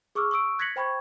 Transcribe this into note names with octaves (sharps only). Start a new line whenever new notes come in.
G#4 C#6 D6 E6 F6
C#6 D#6 E6 D7
F#6 G#6 A#6 B6 C#7 F#7
C5 G5 B5 C#6 G#6